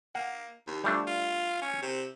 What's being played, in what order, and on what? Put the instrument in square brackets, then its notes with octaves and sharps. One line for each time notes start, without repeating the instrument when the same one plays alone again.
[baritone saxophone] A#3 [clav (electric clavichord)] F#5
[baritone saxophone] D#2
[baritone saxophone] F3 [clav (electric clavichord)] G3 A3 D4
[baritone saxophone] F4
C#4
C3